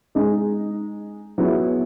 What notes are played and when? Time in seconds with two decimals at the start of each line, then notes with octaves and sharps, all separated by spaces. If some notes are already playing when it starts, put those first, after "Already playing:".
0.15 G#3 D#4 G#4
1.38 F#3 B3 E4 G#4